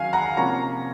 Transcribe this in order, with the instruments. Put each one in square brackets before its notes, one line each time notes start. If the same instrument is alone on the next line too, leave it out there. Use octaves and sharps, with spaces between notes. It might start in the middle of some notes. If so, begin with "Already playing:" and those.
Already playing: [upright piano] D#3 F#3 C#4 F5 G#5
F#5 A#5
C3 F3 A#3 C#4 A#5 C#6